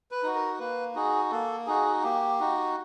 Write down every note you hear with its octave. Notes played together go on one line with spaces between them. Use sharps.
B4
D#4 F#4
A#4
A#3 B4
D#4 F#4 G#4
A#3 A4
D#4 F#4 G#4
A#3 G4
D#4 F#4